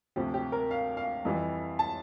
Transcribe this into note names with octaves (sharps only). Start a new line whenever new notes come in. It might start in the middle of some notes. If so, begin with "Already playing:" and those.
D2 C3 F3 G4
G4
A#4
F5
F5
F2 E3 G3
A5